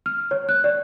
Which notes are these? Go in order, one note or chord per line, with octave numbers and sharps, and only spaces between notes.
F6
C#5
F#6
D5